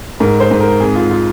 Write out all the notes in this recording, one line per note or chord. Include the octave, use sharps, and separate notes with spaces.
G#2 A#4
C5
G#2
A#4
F2 G#4
F4
F4